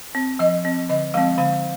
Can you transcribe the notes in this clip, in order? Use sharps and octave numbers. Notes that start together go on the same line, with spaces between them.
C4
F3 D#5
C4
D3 D#5
F3 G#3 C4 F5
D3 F5